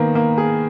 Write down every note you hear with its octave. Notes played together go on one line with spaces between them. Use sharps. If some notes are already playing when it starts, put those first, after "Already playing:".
Already playing: D#3 A#3 B3
A#3
G#4